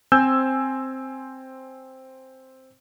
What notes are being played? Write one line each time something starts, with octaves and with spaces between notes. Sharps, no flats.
C4 C5 G#5 E6 G6